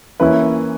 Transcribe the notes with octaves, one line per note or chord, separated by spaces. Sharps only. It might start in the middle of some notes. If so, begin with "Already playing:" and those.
E3 A#3 C#4 E4 B4